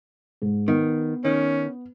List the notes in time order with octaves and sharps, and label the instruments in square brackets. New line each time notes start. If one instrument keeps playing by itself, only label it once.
[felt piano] G#2
[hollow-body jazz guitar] D#3 [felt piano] B3
[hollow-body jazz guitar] D#3 [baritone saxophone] C#4